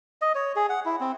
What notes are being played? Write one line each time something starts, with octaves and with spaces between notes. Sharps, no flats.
D#5
C#5
G#4
F#5
E4
C4